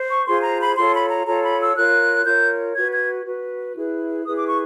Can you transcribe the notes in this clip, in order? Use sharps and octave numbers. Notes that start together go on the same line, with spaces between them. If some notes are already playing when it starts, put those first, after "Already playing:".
Already playing: C5
C#6
F4 G#4 C5 C6
A#5
B5
F4 A4 C#5 C6
B5
A#5
F4 A4 C#5 A#5
B5
E6
F4 A#4 C#5 F#6
F4 A#4 C#5 G6
F#4 B4 G#6
G#6
F#4 B4
E4 G#4 B4
E4 G#4 B4 D#6
D6
C#6